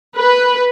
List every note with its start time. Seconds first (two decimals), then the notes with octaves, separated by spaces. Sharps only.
0.16 B4